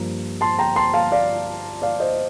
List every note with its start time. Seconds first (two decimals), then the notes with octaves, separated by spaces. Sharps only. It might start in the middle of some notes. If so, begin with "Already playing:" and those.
Already playing: G2 F3 A#3 A#5
0.41 A5 C6
0.59 G5 A#5
0.76 A5 C6
0.94 F5 A5
1.12 D5 F5
1.82 D5 F5
2.00 C5 D#5